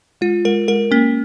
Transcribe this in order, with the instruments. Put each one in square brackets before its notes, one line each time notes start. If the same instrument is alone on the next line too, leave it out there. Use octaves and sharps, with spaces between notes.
[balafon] G#3 [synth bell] F4
[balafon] G#3 [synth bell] A#4
[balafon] G#3 [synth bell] A#4
[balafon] A#3 [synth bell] C#4